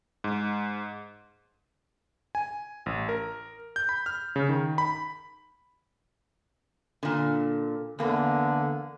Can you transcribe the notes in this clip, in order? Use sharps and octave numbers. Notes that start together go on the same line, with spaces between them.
G#2
G#5
A1
A#4
G6
B5
F6
C#3
D#3
B5
A#2 D3
E2 D3 A#3 B3